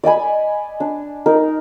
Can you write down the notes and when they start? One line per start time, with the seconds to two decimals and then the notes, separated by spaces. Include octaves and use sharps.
0.03 D5 D#5 G#5 B5
0.80 D4
1.26 D#4 A#4